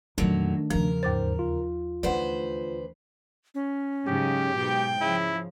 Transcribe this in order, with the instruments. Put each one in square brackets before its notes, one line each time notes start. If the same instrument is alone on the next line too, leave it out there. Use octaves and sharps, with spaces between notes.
[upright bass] F2 A#2 [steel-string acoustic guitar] D3 F#3 [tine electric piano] D#3 A3 D4
[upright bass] E2 C#3 [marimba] F3 [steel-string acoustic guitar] A#4
[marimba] D#2 D6 A6 [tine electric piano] G#2 C5
[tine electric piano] F4
[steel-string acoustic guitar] D2 B4 C5 [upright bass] E3 D#4 [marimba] D5 F#5
[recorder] C#4
[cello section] G#2 C#3 F#3 [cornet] G4
[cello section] G#2 B2 [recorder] G5
[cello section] C#3 F3 [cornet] E4